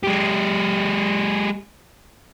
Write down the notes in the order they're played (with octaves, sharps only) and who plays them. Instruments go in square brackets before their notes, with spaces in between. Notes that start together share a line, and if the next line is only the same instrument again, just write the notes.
[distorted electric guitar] G#3 G4